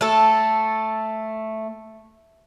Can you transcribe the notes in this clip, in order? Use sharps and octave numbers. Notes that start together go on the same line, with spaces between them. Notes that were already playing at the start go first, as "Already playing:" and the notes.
A3 A4